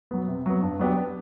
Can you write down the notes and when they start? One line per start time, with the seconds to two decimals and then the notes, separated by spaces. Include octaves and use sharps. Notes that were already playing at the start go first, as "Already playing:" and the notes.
0.11 F#3 B3
0.28 C3
0.46 F#3 B3
0.62 G2
0.79 F#3 B3 D4 G4